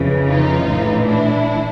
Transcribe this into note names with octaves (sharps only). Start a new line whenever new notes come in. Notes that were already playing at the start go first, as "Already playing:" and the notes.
Already playing: F2 C#3 E3
D#4 F4
A#1 A2 E3
D4 E4